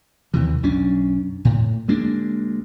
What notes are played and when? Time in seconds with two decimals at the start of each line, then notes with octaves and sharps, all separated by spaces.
0.34 D#2 C3 E3
0.63 B1 F#2 C#4 D4
1.45 A2
1.88 D2 G#3 A#3 D4